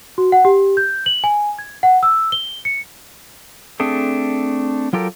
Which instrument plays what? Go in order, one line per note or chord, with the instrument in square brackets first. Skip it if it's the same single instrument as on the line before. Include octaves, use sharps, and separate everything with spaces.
[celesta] F#4
F#5
G4
G6
F#7
G#5
G#6
F#5
E6
G7
C#7
[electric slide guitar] A3 C4 D4 G#4 A4
F#3 F4 G4 A4 A#4